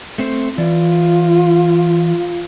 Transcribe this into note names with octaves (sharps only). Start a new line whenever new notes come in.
A3 C4 C5
E3 F4 D5